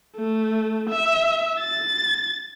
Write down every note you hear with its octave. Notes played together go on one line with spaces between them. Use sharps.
A3
E5
A6